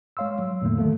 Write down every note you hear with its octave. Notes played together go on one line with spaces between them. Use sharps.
G#3 C#5 F5 C6 E6
F#3
E2 A2 D3 A3 A#3
D3 D#3 F#3 A3 A#3 A4